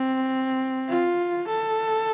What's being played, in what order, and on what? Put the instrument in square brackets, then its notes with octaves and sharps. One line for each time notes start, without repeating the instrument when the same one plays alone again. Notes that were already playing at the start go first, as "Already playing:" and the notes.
Already playing: [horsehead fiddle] C4
F4
A4